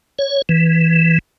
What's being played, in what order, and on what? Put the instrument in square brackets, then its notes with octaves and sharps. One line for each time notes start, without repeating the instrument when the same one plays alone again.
[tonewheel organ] C#5
E3